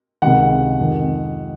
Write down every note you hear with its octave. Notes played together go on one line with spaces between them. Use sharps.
C#2 C3 D#3 F#5
F2 D#3